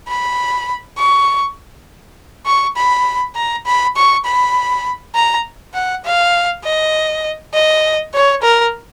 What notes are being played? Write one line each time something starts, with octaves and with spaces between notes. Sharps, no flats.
B5
C#6
C#6
B5
A#5
B5
C#6
B5
A#5
F#5
F5
D#5
D#5
C#5
A#4